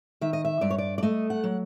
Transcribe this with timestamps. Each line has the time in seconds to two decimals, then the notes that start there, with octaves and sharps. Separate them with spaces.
0.21 D#3 E5
0.33 D#5
0.45 E5
0.61 G2 D5
0.70 C#5
0.78 D5
0.98 D5
1.03 A3 D#5
1.30 F#5
1.44 F#3